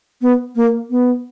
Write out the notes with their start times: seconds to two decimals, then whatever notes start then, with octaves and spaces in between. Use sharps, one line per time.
0.22 B3
0.56 A#3
0.90 B3